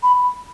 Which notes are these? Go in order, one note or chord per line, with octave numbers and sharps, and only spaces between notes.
B5